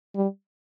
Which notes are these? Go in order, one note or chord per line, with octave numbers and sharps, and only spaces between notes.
G3